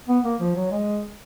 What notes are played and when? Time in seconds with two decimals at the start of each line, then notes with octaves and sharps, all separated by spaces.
0.08 B3
0.24 A#3
0.40 F3
0.55 F#3
0.71 G#3